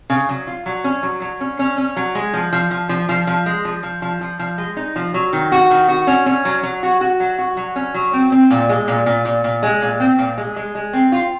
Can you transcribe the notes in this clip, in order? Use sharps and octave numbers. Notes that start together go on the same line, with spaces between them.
C#3
F#3
F4
F#3
C#4
F#3
F#3
C#4
C#4
C#4
F#3
G#3
F3
F3
F3
F3
F3
F3
G#3
F3
F3
F3
F3
F3
G#3
D#4
F3
F#3
D#3
F#4
D#3
F#4
C#4
C#4
F#3
F#3
F#4
F#4
F#3
F#4
F#3
C#4
F#3
C4
C4
A#2
G#3
A#2
A#2
A#2
A#2
G#3
A#2
C4
A#2
G#3
G#3
G#3
C4
F4